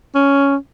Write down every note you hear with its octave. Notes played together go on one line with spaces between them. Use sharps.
C#4